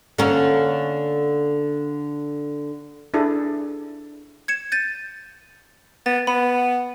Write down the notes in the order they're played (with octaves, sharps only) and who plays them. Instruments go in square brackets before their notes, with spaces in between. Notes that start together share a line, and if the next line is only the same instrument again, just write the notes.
[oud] D3 A#3 C#4
[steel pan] D4 E4 G#4 A4 D5
[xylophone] G#6 C#7 E7
G6 A6 D#7
[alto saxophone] B3 [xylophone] A6
[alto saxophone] B3 [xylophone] B5